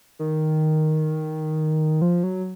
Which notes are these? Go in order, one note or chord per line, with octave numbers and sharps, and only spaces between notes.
D#3
F3
F#3